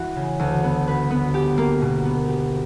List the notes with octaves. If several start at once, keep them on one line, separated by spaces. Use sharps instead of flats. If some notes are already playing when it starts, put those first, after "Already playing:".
Already playing: E3 F#4
C#3
D2
B3
B4
B3
G4
A#3
B2
B3
G4